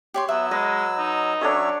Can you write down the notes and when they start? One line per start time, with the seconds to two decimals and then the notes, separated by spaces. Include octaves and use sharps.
0.14 G4 C#5 C6
0.29 F#3 B3 E5 E6
0.51 G#3 B4 D#5
0.98 D#4
1.41 F#3 C#4 D4 A4 C#5 E5